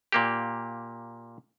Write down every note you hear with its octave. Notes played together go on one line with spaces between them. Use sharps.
A#2 A#3 G4